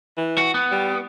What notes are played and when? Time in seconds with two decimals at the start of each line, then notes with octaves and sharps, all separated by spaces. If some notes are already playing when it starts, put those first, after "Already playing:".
0.17 E3
0.38 F#4
0.54 B3
0.71 G3